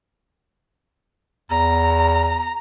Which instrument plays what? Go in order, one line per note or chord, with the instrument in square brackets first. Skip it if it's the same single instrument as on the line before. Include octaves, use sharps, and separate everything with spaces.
[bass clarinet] E2 [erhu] A#5